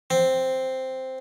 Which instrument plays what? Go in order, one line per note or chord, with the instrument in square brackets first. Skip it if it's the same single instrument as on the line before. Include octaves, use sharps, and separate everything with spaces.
[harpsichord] C4